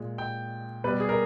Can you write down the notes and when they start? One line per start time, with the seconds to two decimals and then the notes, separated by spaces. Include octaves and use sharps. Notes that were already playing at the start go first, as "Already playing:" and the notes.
Already playing: A#2 G#3
0.18 G5
0.84 B2 G3 B4
1.00 G#4
1.09 A#4